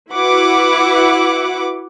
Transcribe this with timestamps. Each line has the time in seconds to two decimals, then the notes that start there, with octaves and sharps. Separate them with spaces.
0.12 E4 F#4 B4 F#5 D6